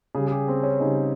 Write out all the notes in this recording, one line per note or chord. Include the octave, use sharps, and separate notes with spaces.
C#3 G3 G#4
G#4
G4
C4
C#4
C#3 G3 D#4